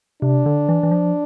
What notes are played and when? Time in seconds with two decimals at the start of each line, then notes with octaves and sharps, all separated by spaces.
0.22 C3 D4
0.46 D3
0.69 E3
0.83 E3
0.91 F3